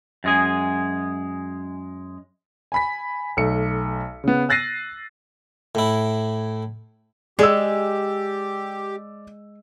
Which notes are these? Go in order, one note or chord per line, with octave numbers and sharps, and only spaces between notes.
F#2 G#3 G#4
G#5 B5 B6
B1 A3 C#7
C#3 B3
E6 F#6 A6 A#6 C7 D#7
A2 E4
G#3 G4 G#4 D5 E6